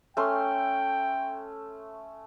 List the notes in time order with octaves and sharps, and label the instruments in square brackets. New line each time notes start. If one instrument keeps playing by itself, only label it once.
[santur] A3 C#4 C6 [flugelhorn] G5